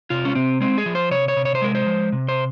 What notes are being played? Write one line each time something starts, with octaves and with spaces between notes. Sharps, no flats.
C3 F4
C#4
C3 C4
G#3 C4
G#4
F3
C5
C3 C#5
C#5
C3
C#5
C5
G#3 A#4
C5
F3
C3
C5